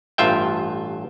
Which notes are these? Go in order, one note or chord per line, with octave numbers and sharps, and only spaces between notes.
A1 G2 F4 E5 G5